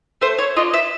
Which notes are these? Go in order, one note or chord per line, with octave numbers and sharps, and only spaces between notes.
A3 C5
C#5
D4 F4 D#5
E5